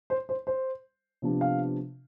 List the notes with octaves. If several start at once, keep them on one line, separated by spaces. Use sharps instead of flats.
C5
C5
C5
C3 F3 B3 D4
F5